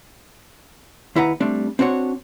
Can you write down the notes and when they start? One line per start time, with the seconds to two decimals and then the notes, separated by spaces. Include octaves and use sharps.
1.16 D#2 E4 B4 F#5 A#5
1.40 G3 A3 C4 D4
1.79 C4 D4 F#4 C5 C#5